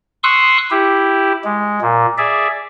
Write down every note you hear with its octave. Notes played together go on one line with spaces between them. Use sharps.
C6 C#6 D#6 E6 F#6
E4 G4
G#3
A#2
G#4 D5 E5